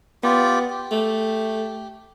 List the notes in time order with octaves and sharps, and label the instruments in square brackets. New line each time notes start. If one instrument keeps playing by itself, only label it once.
[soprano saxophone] B3 [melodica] F4 G4 D5
[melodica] G4
[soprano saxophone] A3